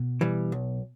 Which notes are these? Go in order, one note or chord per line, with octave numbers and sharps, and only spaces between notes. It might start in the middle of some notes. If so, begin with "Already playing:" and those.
Already playing: B2
E3 G3
B1